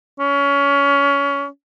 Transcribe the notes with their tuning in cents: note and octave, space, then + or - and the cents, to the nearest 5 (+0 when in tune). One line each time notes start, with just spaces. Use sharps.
C#4 +25